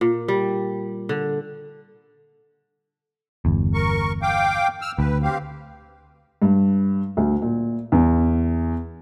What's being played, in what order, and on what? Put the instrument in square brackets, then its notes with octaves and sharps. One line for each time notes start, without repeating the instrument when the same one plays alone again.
[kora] A#2
G3
D3
[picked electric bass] G1 E2
[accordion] A#4 C#6
F5 G5 D6
E6 F6
[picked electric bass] D2 [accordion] B4
[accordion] C4 G4 F5
[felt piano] G2
D2
A#2
E2